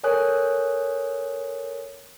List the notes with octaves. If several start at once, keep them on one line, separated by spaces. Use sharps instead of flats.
A4 A#4 C#5 G#5 D#6 F#6